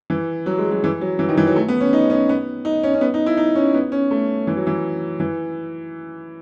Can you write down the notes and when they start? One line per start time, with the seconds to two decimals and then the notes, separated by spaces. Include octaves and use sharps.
0.10 E3
0.46 F#3
0.58 G#3
0.72 F#3
0.84 E3
1.01 F#3
1.19 E3
1.29 D#3
1.37 E3
1.47 F#3
1.56 A3
1.68 B3
1.81 C#4
1.93 D#4
2.10 C#4
2.29 B3
2.65 D#4
2.83 C#4
2.94 C#4
3.01 B3
3.14 D#4
3.26 E4
3.37 D#4
3.56 C#4
3.74 B3
3.92 C#4
4.11 A3
4.47 E3
4.57 F#3
4.67 E3
5.20 E3